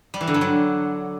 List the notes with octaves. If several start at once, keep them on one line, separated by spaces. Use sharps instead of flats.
G3
E3
D3
G2
F#3